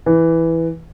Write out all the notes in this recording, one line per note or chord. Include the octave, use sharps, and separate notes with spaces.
E3